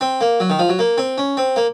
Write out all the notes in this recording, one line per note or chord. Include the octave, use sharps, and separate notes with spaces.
C4
A#3
F#3
D#3
F3
F#3
A#3
C4
C#4
C4
A#3